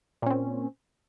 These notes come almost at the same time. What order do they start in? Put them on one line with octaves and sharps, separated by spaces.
A#2 C#4 C4